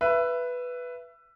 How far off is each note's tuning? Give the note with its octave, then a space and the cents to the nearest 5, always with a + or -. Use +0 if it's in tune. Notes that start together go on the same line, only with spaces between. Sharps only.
B4 +0 E5 +20